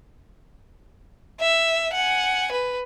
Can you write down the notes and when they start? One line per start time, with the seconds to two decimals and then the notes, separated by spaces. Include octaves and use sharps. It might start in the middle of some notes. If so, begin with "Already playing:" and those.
1.41 E5
1.94 F#5 G#5
2.52 B4